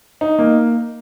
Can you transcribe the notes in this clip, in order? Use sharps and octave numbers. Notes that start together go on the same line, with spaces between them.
D#4
A#3